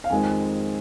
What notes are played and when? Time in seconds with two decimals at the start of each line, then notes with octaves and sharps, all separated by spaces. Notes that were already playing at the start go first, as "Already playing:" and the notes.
0.04 F5
0.10 F2 D#3 G#3 C4 G#5